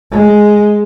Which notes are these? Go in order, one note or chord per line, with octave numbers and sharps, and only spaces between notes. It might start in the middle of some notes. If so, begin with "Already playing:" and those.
G#3